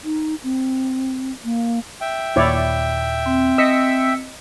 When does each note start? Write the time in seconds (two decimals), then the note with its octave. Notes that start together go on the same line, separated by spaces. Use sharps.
0.04 D#4
0.43 C4
1.44 A#3
2.01 E5 G5
2.36 D#2 A#2 E4 C#5 D5
3.26 C4
3.58 D#5 E6 B6 C#7